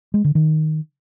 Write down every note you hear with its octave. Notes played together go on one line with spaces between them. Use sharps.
G#3
D3
D#3